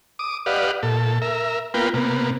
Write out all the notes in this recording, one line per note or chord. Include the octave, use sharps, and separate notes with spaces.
D6 D#6
G4 B4 D5 D#5 F5 F#5
A#2 A4
A#4 E5
A#3 B3 F4 A#4 B4 G5
C3 A#3 B3